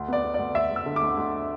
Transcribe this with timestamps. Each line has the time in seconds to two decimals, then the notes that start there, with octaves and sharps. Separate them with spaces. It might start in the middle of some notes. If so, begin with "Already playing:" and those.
Already playing: D2
0.08 B3 D5
0.24 B3
0.34 D5
0.39 D2
0.55 D2 E5
0.71 D2
0.76 E6
0.86 D3
0.96 D6
1.01 D2
1.17 D2